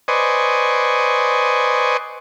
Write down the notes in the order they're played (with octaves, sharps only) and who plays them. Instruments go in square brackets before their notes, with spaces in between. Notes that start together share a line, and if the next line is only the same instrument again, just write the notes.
[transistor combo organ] B4 C5 D5 D#5 G#5 C#6